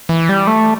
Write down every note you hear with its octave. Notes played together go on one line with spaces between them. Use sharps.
E3
G3
A3